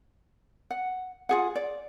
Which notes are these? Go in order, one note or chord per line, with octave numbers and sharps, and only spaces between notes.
F#5
F4 G#4 F#5
D5